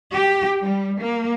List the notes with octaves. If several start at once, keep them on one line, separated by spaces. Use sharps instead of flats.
G4
G3
A#3